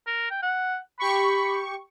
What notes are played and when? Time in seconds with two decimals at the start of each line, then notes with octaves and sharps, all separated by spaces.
0.07 A#4
0.31 G5
0.43 F#5
0.99 G4 B5 C#6